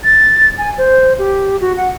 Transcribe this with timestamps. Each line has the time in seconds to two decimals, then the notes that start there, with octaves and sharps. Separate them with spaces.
0.04 A6
0.58 G#5
0.78 C5
1.19 G4
1.61 F#4
1.77 F#5